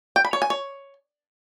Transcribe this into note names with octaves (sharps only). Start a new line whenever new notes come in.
G5
B5
C#5
G#5
C#5